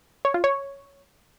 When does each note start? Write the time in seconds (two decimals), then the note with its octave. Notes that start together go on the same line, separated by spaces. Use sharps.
0.25 C#5
0.34 F4
0.44 C#5